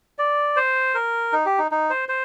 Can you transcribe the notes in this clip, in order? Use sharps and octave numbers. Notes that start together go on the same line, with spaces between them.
D5
C5
A#4
D#4
G4
D#4
D#4
C5
C5